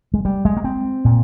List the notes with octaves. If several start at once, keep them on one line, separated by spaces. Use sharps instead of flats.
G#3
G3
G#3
A#3
C4
A#2